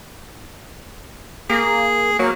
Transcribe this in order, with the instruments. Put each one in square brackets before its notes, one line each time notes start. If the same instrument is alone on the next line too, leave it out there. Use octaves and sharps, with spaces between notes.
[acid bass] A#3 [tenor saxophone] G#4
[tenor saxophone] F#3 [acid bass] A#3